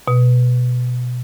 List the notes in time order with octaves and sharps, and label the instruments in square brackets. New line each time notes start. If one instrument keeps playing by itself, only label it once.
[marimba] B2